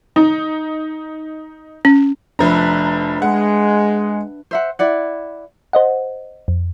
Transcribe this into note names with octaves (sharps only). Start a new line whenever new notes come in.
D#4
C#4
F1 F3 D4 B4 E5 A#5
G#3 F#5
C5 E5 F#5
E4 D5 F#5
C5 D#5 F#5
F2